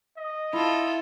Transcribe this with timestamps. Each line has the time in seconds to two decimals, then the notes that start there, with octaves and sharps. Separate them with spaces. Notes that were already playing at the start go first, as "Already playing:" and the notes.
0.17 D#5
0.53 E4 F4 A4